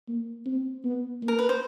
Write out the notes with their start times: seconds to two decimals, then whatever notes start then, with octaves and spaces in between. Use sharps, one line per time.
0.08 A#3
0.46 C4
0.84 B3
1.22 A#3
1.28 A#4
1.39 B4
1.49 C5